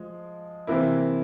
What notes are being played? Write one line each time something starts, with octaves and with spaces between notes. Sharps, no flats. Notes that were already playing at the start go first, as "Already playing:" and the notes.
Already playing: F3 G#3
C3 E3 A#3 E4